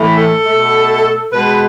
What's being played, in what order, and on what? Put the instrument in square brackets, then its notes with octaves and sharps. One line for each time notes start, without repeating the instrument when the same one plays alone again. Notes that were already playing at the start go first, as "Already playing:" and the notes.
Already playing: [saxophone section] A2 E3 A3
A4
B2 A3
B2 G#3 B4